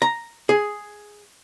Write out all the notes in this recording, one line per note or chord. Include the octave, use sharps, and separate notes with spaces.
A#5
G#4